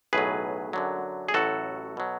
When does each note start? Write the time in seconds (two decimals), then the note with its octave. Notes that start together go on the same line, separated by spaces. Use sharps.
0.13 B1 A2 F#3 G#4 B4
0.73 F#2 D3 F#3
1.29 G#4
1.34 A1 A2 F#3 F#4 A4
1.97 B2 F#3